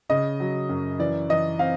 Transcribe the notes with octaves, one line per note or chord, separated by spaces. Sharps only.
C#3 D#5
F#3
F#2
E3 D5
E3 D#5
C4 F5